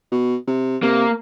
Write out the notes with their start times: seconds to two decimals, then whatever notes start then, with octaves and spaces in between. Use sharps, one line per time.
0.12 B2
0.47 C3
0.83 C3 A#3